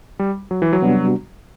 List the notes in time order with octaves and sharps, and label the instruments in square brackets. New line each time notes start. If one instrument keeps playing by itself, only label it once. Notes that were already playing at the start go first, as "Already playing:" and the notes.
[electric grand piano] G3
F#3
E3
F#3
[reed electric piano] C3 G3 B3 D4 F#4